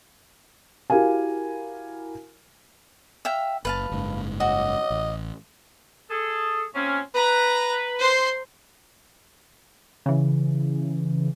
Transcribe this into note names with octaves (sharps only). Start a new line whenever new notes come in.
E4 F#4 G4 A#4 F5 G#5
E5 F5 G5
F#1 B4 F5 A5
F#1 G#2
F#4 D#5
A1
G#4 A4
A#2 C4 C#4
B4 A#5
C5 C6
C#3 E3